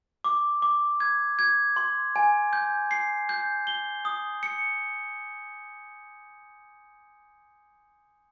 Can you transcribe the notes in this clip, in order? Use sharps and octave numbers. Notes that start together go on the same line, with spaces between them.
D6
D6
G#6
G#6
C6
G#5
G6
C7
G6
G7
D#6
C#7